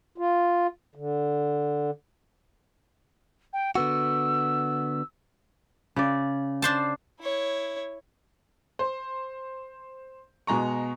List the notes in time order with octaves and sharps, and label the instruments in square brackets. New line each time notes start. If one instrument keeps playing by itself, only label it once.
[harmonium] F4
D3
[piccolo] G5
[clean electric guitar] D3 B3 F#4 [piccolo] E6
[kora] C#3 D5
[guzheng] D4 C5 A5
[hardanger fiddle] E4 C#5
[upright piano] C5
B2 G#3 A#5 C#6